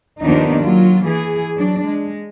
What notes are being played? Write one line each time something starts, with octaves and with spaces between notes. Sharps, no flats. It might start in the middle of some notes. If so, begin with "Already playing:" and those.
D#2 D#3 F3 B3 D4 D#4
F#3 A#3 F4
E3 G#4
F#3 D4
G#3